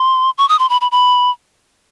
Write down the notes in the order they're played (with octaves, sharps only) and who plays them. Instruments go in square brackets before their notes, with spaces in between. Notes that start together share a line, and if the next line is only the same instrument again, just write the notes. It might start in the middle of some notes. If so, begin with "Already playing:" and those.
Already playing: [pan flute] C6
C#6
D#6
C6
B5
B5
B5